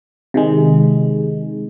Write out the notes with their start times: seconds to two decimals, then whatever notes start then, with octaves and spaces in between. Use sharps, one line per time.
0.34 C3 D#3 G#3